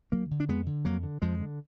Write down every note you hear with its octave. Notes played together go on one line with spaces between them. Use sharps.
D2 F#3 A#3
D3
D4
F2 G#3 B3
D3
F2 F#3 A#3
D3
F2 F3 G#3
D3